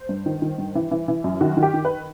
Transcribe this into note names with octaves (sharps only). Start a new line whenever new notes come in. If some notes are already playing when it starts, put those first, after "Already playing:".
Already playing: C5
G2
D#3
D#3
G2
E3
E3
E3
F#2
D#3 F#4
D#3
G4
D#3
B4